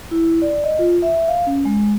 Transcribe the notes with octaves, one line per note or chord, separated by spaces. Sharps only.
E4
D5
D#5
F4
E5
F5
C#4
G#3